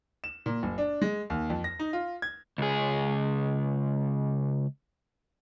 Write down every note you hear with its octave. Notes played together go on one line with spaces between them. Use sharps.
E7
A#2
F#1
D4
G#3
D#2
F2
A#6
D#4
F4
G#6
C#2 G#4